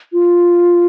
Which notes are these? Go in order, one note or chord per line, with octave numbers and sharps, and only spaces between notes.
F4